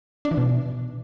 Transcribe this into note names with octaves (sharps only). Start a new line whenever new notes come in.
D4
E3
B2